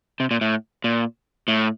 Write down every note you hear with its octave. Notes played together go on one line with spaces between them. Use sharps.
C3
A#2
A2
A#2
A2